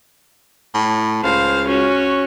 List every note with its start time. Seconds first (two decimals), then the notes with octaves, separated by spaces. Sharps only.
0.74 A2
1.23 C#2 C5 F5
1.67 C#4 F#4